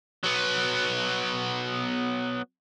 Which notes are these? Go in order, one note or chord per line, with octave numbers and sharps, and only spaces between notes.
F#3 B3